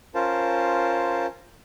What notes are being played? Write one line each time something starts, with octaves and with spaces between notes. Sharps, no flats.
C#4 F4 A#4 C5 A5